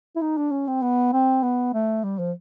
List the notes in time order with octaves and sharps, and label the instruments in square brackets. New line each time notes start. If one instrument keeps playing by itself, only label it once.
[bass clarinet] E4
D#4
D4
C#4
C4
B3
C4
B3
A3
G3
F3